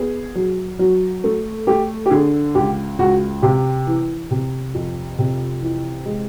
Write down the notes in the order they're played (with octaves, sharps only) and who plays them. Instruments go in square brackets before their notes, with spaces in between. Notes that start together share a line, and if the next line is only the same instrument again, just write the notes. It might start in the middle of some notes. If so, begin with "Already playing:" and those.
Already playing: [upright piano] B3 G#4
F#3
F#3
A3
A3 G4
G4
D3 G#4
C#2 G4
C#2 F#4
C3 G4
E3
C3
F2
C3
E3
G#3